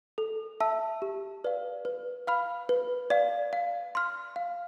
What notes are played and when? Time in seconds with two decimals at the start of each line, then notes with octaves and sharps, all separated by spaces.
0.18 A4
0.60 E5 A5 E6
1.02 G4
1.44 B4 D5 F5
1.85 B4
2.27 F5 B5 F6
2.69 B4
3.10 D5 F5
3.53 F5
3.95 C6 F6
4.36 F5